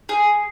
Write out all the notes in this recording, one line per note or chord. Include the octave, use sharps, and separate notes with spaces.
G#4